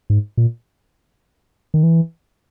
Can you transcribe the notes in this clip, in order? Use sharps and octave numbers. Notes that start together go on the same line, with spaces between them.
G#2
A#2
D#3
E3